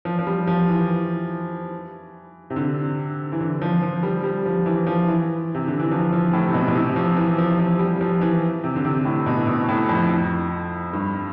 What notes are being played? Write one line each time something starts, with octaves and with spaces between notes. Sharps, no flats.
F3
F3
G3
F3
E3
C3
D3
E3
D3
F3
F3
G3
G3
F3
E3
F3
E3
C3
D3
E3
F3
F3
A2
C3
B2
B2
C3
F3
E3
F3
F3
G3
F3
E3
C3
D3
C3
A2
B2
B2
A2
F2
G2